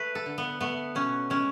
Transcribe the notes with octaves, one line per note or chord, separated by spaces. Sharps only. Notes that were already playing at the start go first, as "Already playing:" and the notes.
Already playing: A3 B4
A4
D3
B3
A3 B3
B2 C#4
G#3 C#4